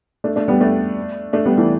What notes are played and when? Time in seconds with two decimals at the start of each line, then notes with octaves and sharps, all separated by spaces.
0.24 A3 D4
0.36 A3 D4
0.48 G3 B3
0.61 A3 D4
1.33 A3 D4
1.45 G3 B3
1.58 E3 A3